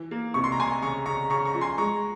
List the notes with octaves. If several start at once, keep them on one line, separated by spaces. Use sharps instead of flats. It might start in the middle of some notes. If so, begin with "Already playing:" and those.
Already playing: E3
A#3
C3 C#6
C6
A#5
C3 G#5 C6
C#3 A#5 C#6
C#3 A#5 C#6
C#3 A#5 C#6
A#5 C#6
F3
G#5 C6
G#3 A#5 C#6